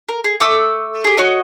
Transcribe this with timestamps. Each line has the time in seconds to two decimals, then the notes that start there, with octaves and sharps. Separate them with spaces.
0.09 A#4
0.24 G#4
0.40 A3 D6 E6
1.04 G4 G#4
1.17 F#4 C#5 D#5